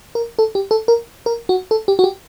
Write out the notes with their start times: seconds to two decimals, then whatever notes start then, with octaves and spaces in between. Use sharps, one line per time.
0.15 A#4
0.39 A4
0.55 G4
0.71 A4
0.88 A#4
1.26 A#4
1.49 F#4
1.71 A4
1.88 G4
1.99 F#4
2.04 G4